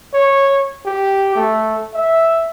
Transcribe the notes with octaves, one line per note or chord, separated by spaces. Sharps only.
C#5
G4
A3
E5